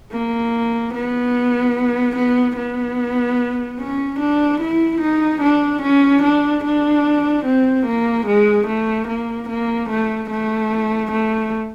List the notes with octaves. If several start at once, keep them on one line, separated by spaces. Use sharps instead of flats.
A#3
B3
B3
B3
C#4
D4
E4
D#4
D4
C#4
D4
D4
C4
A#3
G#3
A3
A#3
A#3
A3
A3
A3